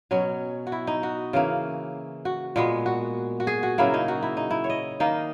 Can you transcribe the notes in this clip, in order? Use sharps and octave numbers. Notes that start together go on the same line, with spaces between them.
B2 F#3 C#4
F#4
E4
D#4
F#4
C#3 E3 A#3
F#4
A#2 G#3 B3
F#4
F#4
G#4
F#4
C#3 F#3 A#3 E4
D#4
F#4
E4
D#4
E4
C#5
D#5
D#3 A#3 D#4